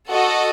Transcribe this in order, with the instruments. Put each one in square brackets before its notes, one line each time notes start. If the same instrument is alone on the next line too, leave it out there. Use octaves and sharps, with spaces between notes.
[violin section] F#4 A4 D#5